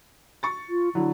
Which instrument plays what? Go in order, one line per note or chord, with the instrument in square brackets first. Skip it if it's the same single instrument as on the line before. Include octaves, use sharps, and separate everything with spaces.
[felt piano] C#6 A6
[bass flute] F4
[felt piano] D3 F#3 [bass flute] E4